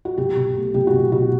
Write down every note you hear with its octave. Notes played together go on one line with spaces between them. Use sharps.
F#4
B1 G4
B2
A3
B1 G4
F#4
B1
B2 F#4